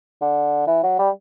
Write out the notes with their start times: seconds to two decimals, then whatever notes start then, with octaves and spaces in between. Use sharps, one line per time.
0.21 D3
0.67 E3
0.83 F#3
0.99 G3